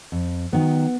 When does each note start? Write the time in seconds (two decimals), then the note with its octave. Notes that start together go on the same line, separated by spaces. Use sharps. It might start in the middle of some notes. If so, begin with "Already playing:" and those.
0.12 F2
0.52 D#3 F#3 B3